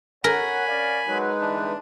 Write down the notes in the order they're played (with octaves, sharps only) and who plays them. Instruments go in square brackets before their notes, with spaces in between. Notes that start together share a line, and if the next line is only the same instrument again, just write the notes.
[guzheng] A#4 [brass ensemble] C#5 F#5 [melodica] G#5 B5
[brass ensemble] C#4 D5 F5
[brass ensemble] F#3 [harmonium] G#3 D#4 B4
[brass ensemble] G1 E3 [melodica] D4